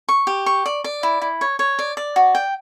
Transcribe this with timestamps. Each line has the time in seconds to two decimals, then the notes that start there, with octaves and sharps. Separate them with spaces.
0.09 C#6
0.27 G4
0.46 C#6
0.66 D5
0.84 D5
1.03 E4
1.22 E4
1.41 C#5
1.59 C#5
1.79 D5
1.97 D5
2.16 F#4
2.35 G5